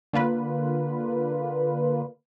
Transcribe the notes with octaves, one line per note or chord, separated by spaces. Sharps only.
D3 A#3 F4 B4